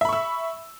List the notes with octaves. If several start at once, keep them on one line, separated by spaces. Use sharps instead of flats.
E5 B5 C#6 E6